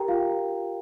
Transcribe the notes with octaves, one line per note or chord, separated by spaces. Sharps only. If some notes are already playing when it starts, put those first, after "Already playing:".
Already playing: G4 A#4 G5 A#5
F4 F5